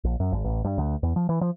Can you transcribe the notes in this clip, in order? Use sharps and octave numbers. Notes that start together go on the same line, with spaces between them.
A#1
F#2
G#1
A1
G2
D2
E2
F3
E3
F3